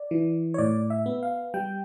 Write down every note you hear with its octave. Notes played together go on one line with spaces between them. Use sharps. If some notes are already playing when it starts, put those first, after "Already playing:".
Already playing: D5
E3
C#5
A2 D5
E5
B3
F5
G3 G5